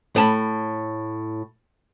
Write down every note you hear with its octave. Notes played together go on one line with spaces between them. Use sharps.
A2 A5 B5